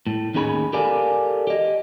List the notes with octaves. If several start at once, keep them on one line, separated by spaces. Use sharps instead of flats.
A2
D#2 C#4 D#4 G#4 A#5 B5
G4 A4 A#4 D5 F5 G#5
G4 D#5